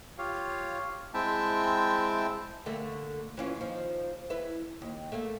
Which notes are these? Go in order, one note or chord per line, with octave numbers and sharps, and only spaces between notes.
F4 G4 C#5 F5
G#3 C4 E4 E5 G5 A5
D3 A3 A#3
E3 C#4 F4
D#2 F3
E4 B4
D#2
A3 A#3